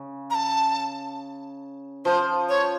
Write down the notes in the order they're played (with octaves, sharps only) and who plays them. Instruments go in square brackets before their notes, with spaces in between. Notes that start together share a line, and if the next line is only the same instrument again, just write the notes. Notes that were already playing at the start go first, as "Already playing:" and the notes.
Already playing: [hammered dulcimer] C#3
[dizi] A#5
A5
[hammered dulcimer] F3 [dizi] C5
[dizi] C#5